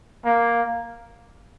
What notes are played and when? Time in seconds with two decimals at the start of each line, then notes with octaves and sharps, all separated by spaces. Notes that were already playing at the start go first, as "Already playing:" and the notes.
0.25 A#3